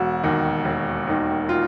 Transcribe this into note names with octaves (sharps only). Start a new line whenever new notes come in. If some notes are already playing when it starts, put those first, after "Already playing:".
Already playing: E1 F#4
D#2 D#3
E1
D#2 D#3
F4